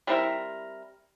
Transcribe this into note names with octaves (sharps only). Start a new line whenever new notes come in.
G3 C4 E4 A#4